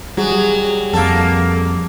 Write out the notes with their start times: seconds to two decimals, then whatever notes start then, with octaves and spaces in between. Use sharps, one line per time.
0.17 F#3 G3 F#4 G#4
0.93 F2 A#3 A4